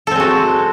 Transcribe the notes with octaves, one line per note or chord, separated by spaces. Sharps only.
G#3 C4 F#4 A4